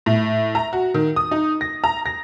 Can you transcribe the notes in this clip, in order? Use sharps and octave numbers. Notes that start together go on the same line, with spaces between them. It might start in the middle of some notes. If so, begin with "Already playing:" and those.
A2
A#5
F#4
D#3
D#6
D#4
A#6
A#5
A#6